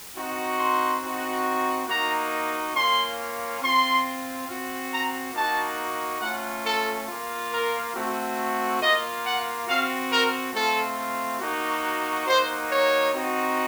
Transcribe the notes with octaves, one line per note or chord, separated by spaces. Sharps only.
C4 D#4 F#4
C6
C4 D#4 F#4
A#3 D#4 F#4 A#5
A#3 C#4 F4 C6
C4 F4 C6
C4 F#4
A#5
A#3 D#4 F#4 A5
A3 C#4 F4 F#5
A4
A#3 F4
A#4
A3 C4 F#4
A#3 F4 D#5
F#5
C4 F#4 F5
A#4
A3 C4 F4 A4
A#3 D#4 F#4
A#3 D#4 F#4 C5
C#5
C4 D#4 F#4